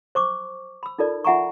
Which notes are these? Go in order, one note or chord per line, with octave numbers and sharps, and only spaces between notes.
C5 C#6 D6
B5 E6
D#4 F4 A4 A#4 D5
F4 E5 F#5 G#5 A#5 C#6